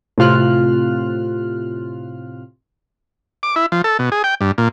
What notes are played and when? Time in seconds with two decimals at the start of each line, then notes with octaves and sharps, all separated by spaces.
0.18 A2 C3 F4 F6 F#6
3.43 D6
3.56 E4
3.72 F3
3.84 A4
3.99 B2
4.12 G#4
4.24 G5
4.41 G2
4.58 A#2